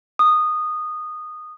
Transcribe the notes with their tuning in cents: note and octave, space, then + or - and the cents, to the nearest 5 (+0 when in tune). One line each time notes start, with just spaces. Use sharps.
D#6 -15